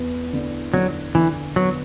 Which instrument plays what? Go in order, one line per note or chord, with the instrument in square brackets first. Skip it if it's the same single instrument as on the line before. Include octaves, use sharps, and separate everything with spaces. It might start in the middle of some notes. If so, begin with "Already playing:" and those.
Already playing: [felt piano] E2 B3
D3
[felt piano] D3 [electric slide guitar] F#3
[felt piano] D3 [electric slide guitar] E3
[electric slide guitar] F#3 [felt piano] B3